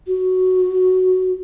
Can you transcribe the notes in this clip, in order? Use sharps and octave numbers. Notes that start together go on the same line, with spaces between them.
F#4